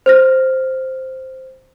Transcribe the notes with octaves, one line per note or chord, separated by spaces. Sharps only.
C5 F6 A#6